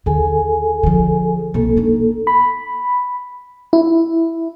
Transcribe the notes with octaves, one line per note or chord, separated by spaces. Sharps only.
D#2 D3 G#4 A4 G#5
D3 F3
C2 C3 A#3 A4
D4 D#4
B5
E4